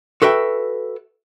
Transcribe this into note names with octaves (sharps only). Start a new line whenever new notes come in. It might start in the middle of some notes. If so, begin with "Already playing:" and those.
F#4 A4 B4 E5 G5